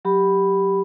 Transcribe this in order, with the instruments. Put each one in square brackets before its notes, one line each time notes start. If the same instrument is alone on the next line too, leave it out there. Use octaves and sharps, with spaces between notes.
[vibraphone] F#3 G4 B5